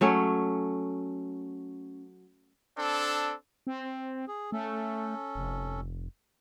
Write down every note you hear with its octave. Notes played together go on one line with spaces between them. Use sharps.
F#3 A3 C#4
C4 D4 A4
C4
G#4
A3 C#4 A4
F1